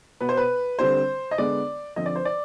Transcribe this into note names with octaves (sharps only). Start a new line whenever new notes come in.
B2 B3 B4
C5
B4
D3 G3 C4 C5
D#5
D3 G#3 B3 D5
D3 F3 C4 D#5
D5
C5
D5